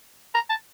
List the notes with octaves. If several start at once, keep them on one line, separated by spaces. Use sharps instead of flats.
A#5
A5